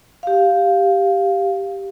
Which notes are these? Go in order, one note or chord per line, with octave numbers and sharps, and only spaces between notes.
G4 F5